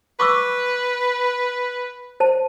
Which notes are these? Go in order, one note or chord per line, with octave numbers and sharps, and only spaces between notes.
B4 C#6 D6 E6
C5 A5